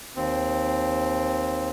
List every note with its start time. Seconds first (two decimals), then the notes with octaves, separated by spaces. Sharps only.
0.16 D#2 C4